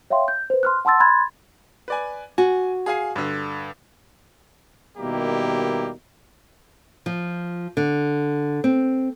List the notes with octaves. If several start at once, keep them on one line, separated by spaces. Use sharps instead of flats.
C#5 E5 F5 G5 C6
G6
B4 C5
C6 F6 F#6
F#5 A5 C6 E6 A6
B5 C6 F#6 G#6 A6
B4 D5 G#5
F#4 G#5
G#4 F5 G#5
G2 D3
B2 D#3 G3 A#3 E4 G4
F3
D3
C4